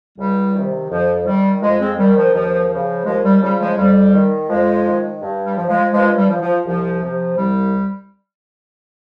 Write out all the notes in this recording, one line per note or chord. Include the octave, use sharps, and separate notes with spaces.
C#2 G3
C3 D#3
F2 F3
D#3 G3
F2 F3 G#3
G#3 C4
D#3 G3
F3
D#2 F3
C#3 F3
D#2 F3 G#3
G3
C#3 F3 G3
F3 G#3
F2 G3
D#3
F2 F3 G#3
D#3
G2
G3
F3
F3 G#3
G2 F3 G#3
G3
F3
F3
C2 F3
C3 F3
C2 G3